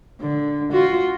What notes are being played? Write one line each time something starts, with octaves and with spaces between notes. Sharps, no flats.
D3
F4 F#4